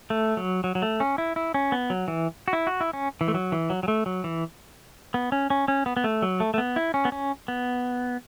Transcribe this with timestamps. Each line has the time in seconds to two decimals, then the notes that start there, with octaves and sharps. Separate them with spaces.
0.10 A3
0.37 F#3
0.64 F#3
0.75 F#3
0.82 A3
1.00 C#4
1.18 E4
1.36 E4
1.54 C#4
1.72 B3
1.90 F#3
2.08 E3
2.48 F#4
2.53 E4
2.67 F#4
2.81 E4
2.93 C#4
3.21 E3
3.28 A3
3.34 F#3
3.52 E3
3.70 F#3
3.83 F#3
3.88 A3
4.06 F#3
4.24 E3
5.14 B3
5.32 C#4
5.50 C#4
5.68 C#4
5.86 B3
5.97 B3
6.04 A3
6.22 F#3
6.40 A3
6.54 A3
6.58 B3
6.76 E4
6.94 C#4
7.05 B3
7.12 C#4
7.48 B3